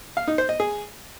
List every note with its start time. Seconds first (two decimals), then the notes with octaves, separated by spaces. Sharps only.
0.17 F5
0.28 D#4
0.38 C5
0.49 D#5
0.60 G#4